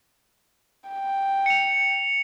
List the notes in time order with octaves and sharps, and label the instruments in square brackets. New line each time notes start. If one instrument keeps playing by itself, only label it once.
[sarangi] G5
[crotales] C#7 F7